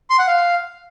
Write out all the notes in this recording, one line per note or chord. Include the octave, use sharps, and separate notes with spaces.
C6
F#5
F5